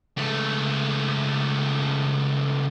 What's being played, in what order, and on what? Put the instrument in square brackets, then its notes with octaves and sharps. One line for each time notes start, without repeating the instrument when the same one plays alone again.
[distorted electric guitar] C#2 A3